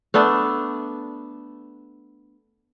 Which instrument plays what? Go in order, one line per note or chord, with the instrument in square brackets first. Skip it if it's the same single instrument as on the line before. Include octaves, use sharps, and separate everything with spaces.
[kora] A3 B3 D4 A4